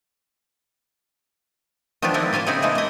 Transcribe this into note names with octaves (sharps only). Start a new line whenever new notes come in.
D#3 F3 G#3 B3 D4 F4
C4 D4 E4 A4 A#4
A#3 F4 G#5 A5
C#3 C4 D#4 E4 G#4 C#5
G#3 A3 D#4 E4 G#5
A#3 D#5